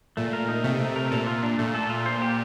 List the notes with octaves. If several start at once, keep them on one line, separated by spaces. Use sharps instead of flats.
A#2 A3
A#4
D#4
C3 A3
A3
A#4
A#2 A4
F4
D4
A#2 A3
A4
F4
C5
G4